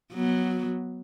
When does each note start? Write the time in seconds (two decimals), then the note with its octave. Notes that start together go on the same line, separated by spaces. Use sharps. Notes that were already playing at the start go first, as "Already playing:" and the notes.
0.14 F#3 B3